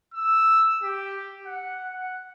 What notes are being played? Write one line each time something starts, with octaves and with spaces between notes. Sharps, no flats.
E6
G4
F#5
F#5